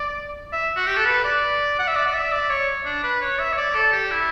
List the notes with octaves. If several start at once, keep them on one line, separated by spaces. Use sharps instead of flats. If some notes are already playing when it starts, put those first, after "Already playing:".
Already playing: D5
E5
F#4
G4
A4
B4
D5
F#5
E5
D5
D5
E5
D5
C#5
D4
B4
C#5
E5
C#5
D5
A4
G4
E4